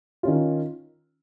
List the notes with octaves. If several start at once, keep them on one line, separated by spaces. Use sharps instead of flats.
D#3 C#4 F4